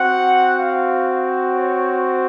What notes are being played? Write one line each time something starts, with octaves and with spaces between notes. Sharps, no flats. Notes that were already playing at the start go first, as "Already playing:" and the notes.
Already playing: C4 F#4 F#5
F5
C#5
C5